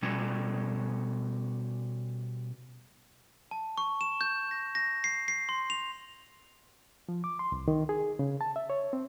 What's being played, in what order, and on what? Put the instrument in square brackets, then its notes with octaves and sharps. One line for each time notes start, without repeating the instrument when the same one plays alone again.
[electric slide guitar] B2 G3 C#4
[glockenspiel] A5
C#6
E7
G6
A#6
A#6
C7
C7
C6
F7
[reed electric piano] F3
D6
C6
C2
D#3
G#4
C#3
A5
E5
C#5
C4